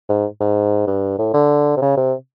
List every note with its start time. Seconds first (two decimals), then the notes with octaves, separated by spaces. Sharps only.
0.09 G#2
0.41 G#2
0.87 G2
1.19 A2
1.34 D3
1.77 C3
1.82 C#3
1.97 C3